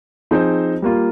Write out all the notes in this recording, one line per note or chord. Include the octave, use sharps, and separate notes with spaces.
F3 C4 D#4 G#4 C5
G3 A#3 F4